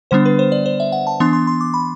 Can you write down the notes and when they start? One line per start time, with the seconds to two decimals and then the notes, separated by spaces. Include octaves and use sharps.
0.11 D3 G3 B3 D4 C5
0.26 B4
0.39 C5
0.52 D5
0.66 C5
0.80 E5
0.92 F#5
1.07 A5
1.20 E3 B3 D4 C6
1.33 C6
1.47 C6
1.61 D6
1.74 B5